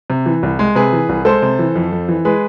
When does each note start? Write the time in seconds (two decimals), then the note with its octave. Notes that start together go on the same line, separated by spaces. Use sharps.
0.10 C3
0.26 E3
0.43 C2
0.59 G#3
0.75 C3 G#4 B4
0.93 E3
1.09 C2
1.25 G#3 A4 C5
1.42 C3
1.59 E3
1.75 F2
1.92 F2
2.09 E3
2.25 G#3 G#4 B4